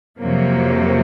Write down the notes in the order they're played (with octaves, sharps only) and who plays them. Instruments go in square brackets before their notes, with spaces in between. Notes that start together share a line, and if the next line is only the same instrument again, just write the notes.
[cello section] F2 C3 F#3 A#3